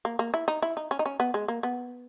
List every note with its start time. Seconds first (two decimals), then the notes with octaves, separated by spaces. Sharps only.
0.05 A#3
0.19 A#3
0.34 E4
0.48 D#4
0.62 E4
0.77 D#4
0.91 C#4
0.99 D#4
1.06 C#4
1.20 B3
1.34 G#3
1.48 A#3
1.63 B3